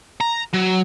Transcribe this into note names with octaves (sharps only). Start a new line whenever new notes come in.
A#5
F#3